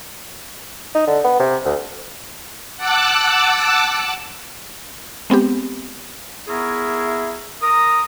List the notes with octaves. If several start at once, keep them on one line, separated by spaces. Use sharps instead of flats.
D#4
D3
B3
C3
D2
F#5 A5 D6 E6 F#6
G#3 B3 C4 G4
B3 E4 G#4 A#4 C#5 E5
A#4 A#5 D#6